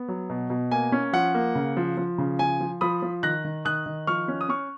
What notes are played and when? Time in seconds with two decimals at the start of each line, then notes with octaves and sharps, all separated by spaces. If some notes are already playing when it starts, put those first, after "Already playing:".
Already playing: B3
0.08 F#3
0.30 B2
0.50 B2
0.71 A#3 G#5
0.92 C#4
1.13 F3 F#5
1.34 A#3
1.55 C#3
1.77 F3
1.97 F3
2.18 C#3
2.39 F3 G#5
2.61 F3
2.81 F3 B5 D#6
3.02 F3
3.23 D#3 F#6 A#6
3.44 D#3
3.65 D#3 D#6 F#6
3.86 D#3
4.07 F3 C#6 F6
4.28 C#4
4.41 D#6
4.49 C#4 C#6 F6